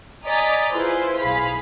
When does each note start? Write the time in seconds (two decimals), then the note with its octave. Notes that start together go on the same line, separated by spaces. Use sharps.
0.24 D5 D#5 G#5 A#5 B6
0.71 E4 F4 G#4 B4 C5
1.18 B1 G#4 F5 B5 B6